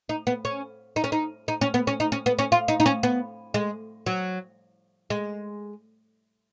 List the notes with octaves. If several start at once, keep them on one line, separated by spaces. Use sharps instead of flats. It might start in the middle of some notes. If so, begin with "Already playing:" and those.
D#4
B3
C#4
D#4
C#4
D#4
D#4
C#4
B3
C#4
D#4
C#4
B3
C#4
F4
D#4
D#4
C#4
B3
G#3
F#3
G#3